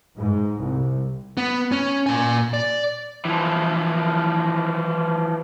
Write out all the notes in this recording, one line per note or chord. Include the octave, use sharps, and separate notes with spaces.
G#2
C2
B3
C#4
A#2 G#5
D5
E3 F3